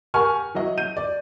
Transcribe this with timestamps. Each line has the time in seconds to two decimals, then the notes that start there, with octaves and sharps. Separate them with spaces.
0.14 G4 A#4 F#5 G#5 C#6 F6
0.54 E3 F#3 E4 D#5
0.78 G6 D#7
0.97 D5